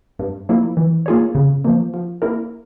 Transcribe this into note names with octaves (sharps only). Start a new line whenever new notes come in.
G2
F3 A#3 E4
E3
A#3 F4 G#4 C#5
C#3
F3 A#3
F3
A#3 E4 A#4